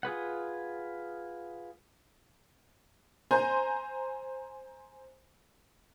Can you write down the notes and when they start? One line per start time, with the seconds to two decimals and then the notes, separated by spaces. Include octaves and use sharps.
0.03 F4 G#4 B4 F#5
3.31 C5 G#5 A#5 C6 G6